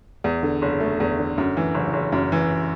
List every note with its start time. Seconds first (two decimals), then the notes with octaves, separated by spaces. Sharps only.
0.24 E2
0.43 D3
0.62 F#1
0.80 A3
1.00 E2
1.18 D3
1.38 F#2
1.57 E3
1.74 F#1
1.93 F#1
2.12 F#2
2.32 E3